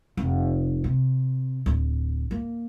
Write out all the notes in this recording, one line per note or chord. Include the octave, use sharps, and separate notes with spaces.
F1
C3
D1
A#3